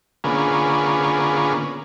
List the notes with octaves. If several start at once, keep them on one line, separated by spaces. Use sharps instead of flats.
D3 A#3 B3 C#4 F4 G#4